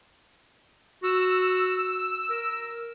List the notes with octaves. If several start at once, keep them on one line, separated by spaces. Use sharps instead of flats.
F#4 E6
A#4